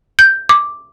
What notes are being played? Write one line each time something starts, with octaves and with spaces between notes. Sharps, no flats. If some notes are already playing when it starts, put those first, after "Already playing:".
G6
D6